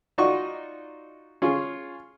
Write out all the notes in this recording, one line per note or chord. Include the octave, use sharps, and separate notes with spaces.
D#4 F4 F#4 D5 D#5 C#6
C#4 F4 G#4